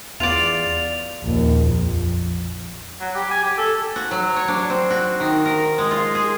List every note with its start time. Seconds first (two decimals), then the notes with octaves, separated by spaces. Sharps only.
0.20 E2 F4 D5 F7
1.22 A#1 D#2
1.65 F2
3.00 F#3
3.15 G4
3.31 G#5
3.43 G4
3.58 A4
3.96 F#4
4.11 F#3
4.36 C#5
4.48 D4
4.70 C4
4.90 F#4
5.20 D#3
5.46 A#4
5.78 G#3
5.91 F4
6.15 G#4